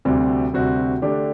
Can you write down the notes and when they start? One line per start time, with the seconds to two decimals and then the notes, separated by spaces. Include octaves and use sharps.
0.05 D2 C3 G3 C4 F#4
0.54 D2 C3 G3 C4 F#4
1.02 D3 A3 D4 G4